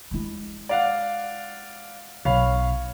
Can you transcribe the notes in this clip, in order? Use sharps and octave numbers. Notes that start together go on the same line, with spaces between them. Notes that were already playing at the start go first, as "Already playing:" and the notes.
G#3 E4
D5 F5 F#5
B1 C#5 F5 B5